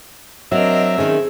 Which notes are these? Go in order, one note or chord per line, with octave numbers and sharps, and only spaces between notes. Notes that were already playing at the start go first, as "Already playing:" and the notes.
F#3 C4 D4 A#4 D#5 E5
D#3 C#4 G#4